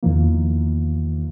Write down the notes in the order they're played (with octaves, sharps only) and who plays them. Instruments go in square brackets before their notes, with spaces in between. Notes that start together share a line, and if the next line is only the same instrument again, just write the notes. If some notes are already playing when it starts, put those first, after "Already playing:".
[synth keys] E2 D#3 F3 A#3